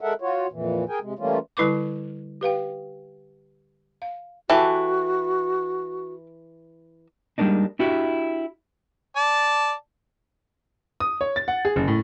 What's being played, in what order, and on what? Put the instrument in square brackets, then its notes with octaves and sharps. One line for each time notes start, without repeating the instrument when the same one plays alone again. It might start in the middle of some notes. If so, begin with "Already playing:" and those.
[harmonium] G#3 A4 A#4 E5 F#5
F4 F#4 C#5
F2 A#2 E3
G#4 A#4 G5 G#5
C3 G#3
E3 G3 A3 A#3 C#4 F4
[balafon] D3 G3 E4 B4 C#6 D6
G4 B4 F5 G5
F5
[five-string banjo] E3 [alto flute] F#4 [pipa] G4 A4
[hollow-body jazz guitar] G3 G#3 A#3 D4 D#4
D4 E4 F#4 G4
[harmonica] D5 A5
[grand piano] D#6
C#5
A6
F#5
G#4
F#1
A2